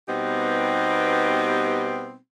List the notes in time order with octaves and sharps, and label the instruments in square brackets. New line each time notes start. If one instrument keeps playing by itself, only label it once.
[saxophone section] B2 G3 B3 C4 D#4 G4